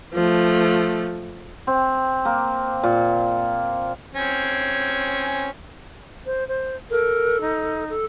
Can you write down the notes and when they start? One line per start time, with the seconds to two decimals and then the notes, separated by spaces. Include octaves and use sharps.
0.14 F3 A3
1.67 C4
2.25 A#3
2.83 A#2
4.15 C4 C#4 G#5
6.26 C5
6.48 C5
6.90 A4 A#4
7.41 D#4
7.89 A4